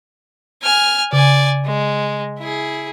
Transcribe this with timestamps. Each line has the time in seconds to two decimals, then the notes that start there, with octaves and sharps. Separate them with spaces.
0.63 G#5 F6
1.13 C#3 D5 G#5
1.66 G#3
2.39 E4 G#4